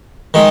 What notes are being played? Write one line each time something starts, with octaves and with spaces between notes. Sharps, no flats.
D#3 G#3